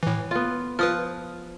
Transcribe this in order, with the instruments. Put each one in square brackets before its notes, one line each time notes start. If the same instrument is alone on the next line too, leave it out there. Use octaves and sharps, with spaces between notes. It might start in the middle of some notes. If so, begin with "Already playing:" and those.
[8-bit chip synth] A2 E3
[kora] B3 F4
[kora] F3 [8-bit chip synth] B4 D#6 F6